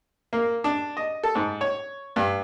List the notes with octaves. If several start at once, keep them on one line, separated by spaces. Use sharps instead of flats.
A#3
D4
D#5
A4
G#2
C#5
G2